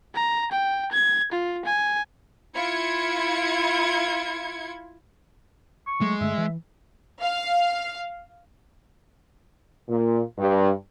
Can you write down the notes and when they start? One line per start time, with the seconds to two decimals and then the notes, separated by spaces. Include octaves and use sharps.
0.14 A#5
0.51 G5
0.92 G#6
1.32 F4
1.65 G#5
2.54 E4 F4 G#6 C#7
5.87 C#6
6.01 F#3 G#3 A3
6.21 G2 D3 A3 E5
6.38 E3
7.21 F5
9.89 A#2
10.38 G2